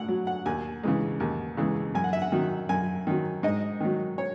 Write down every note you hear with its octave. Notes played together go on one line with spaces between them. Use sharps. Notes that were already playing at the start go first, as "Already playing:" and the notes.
Already playing: A2 F#5
F#3
F#5
D#2 G#5
C#3 E3 G#3
D#2
C#3 E3 G#3
F#2 G#5
F#5
E5
F#5
D#3 F#3
F#2 G#5
D#3 F#3
G#2 D#5
D#3 F#3
C#5